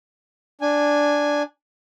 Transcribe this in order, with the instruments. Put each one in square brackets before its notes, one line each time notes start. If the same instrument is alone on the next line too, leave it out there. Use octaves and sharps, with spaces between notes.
[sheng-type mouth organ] D4 G#5